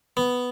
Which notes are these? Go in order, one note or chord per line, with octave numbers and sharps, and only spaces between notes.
B3